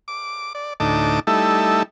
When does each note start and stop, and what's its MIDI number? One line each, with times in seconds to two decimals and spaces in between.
0.08 0.53 86
0.55 0.73 74
0.80 1.20 38
0.80 1.20 45
0.80 1.20 63
0.80 1.20 81
0.80 1.20 86
1.27 1.83 55
1.27 1.83 57
1.27 1.83 63
1.27 1.83 64
1.27 1.83 69